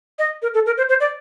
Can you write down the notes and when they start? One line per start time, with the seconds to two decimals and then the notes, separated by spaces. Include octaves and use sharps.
0.19 D#5
0.42 A#4
0.54 A4
0.66 A#4
0.77 C5
0.89 C5
1.00 D5